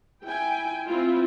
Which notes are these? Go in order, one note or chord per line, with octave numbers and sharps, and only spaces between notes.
E4 G5 G#5
C4 E4 F4